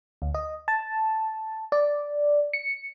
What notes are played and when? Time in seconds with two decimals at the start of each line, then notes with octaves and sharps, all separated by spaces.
0.22 D2
0.34 D#5
0.68 A5
1.72 D5
2.53 C#7